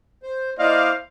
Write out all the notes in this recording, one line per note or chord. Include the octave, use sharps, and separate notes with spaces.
C5
A#3 E4 C5 D5 D#5 F5